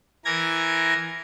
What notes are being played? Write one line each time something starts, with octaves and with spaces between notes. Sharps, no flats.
E3 A#4 G#6 A#6